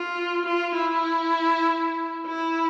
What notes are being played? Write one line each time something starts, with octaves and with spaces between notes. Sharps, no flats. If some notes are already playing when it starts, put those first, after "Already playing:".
Already playing: F4
F4
E4
E4